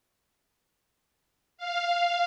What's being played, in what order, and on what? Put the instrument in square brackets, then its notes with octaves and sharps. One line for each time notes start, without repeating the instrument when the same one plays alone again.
[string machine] F5